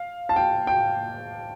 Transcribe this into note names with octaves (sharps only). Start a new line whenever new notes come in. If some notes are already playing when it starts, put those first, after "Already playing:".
Already playing: F5
A5
G5
G5